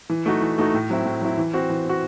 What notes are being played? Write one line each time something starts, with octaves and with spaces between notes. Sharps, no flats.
E3
A3 D#4 F#4
E3
A3 D#4 F#4
A2
F#3 C4 E4
A2
F#3 C4 E4
E3
C4 F#4
E3
C4 F#4